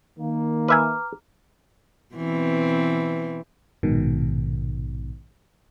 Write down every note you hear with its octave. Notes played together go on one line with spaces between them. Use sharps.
D#3 A#3
B4 E5 G#5 A#5 D6 F6
B2 E3 C4
A#1 G#2 B2 D#3